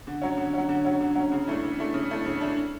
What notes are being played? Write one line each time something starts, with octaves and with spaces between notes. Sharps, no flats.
D3
F#3 C#4
D3
F#3 C#4
D3
F#3 C#4
D3
F#3 C#4
C#3
E3 A3 D4
C#3
E3 A3 D4
C#3
E3 A3 D4
C#3
E3 A3 D4